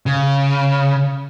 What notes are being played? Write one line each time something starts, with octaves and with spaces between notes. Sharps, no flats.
C#3